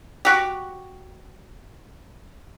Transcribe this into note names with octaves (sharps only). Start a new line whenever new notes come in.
F#4 G4